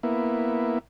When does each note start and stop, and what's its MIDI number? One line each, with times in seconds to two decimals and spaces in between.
0.03 0.78 58
0.03 0.78 59
0.03 0.78 64